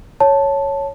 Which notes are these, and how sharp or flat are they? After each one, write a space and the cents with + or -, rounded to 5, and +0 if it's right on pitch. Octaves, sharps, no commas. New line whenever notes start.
C#5 +0 A5 +0